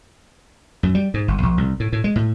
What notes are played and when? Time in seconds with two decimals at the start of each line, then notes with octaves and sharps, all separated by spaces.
0.83 F#2
0.95 G3
1.14 G#2
1.28 G1
1.43 A#1
1.57 C2
1.80 A2
1.93 A2
2.04 G#3
2.16 A2